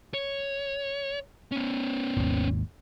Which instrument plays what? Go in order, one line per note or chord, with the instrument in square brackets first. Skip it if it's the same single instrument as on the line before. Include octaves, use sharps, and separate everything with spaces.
[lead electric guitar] C#5
B3 C#4
[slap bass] G#1 D#2 B2